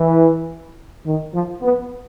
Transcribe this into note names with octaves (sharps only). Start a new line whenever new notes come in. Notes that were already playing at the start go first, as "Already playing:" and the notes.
Already playing: E3
D#3
F3
B3